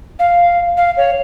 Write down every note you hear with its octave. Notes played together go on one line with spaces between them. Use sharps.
F5
F5
C#5